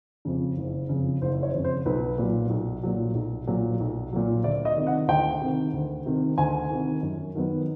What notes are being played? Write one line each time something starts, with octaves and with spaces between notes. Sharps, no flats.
F2 C#3
F#1
F2 C#3
F#1 C5
C#5
F2 C#3
C5
B1 B4
A#2 F#3
B1
A#2 F#3
B1
A#2 F#3
B1
A#2 F#3
D2 D5
D#5
C3 D#3
F#5
D2 G5
C3 D#3
D2
C3 D#3
D2 G#5
C3 D#3
F#2
D#3 F#3 B3